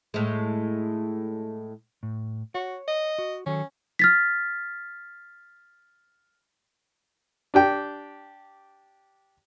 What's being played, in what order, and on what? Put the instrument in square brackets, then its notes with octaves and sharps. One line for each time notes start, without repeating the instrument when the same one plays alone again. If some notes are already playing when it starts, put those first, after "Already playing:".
[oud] A2 G#3
[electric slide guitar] A2
[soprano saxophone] F#4 [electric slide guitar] C#5
[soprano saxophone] D#5
[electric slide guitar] F#4
[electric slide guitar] D#3 F#3 A4 [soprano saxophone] C#4
[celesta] F6 A6 B6
[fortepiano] D4 G4 G5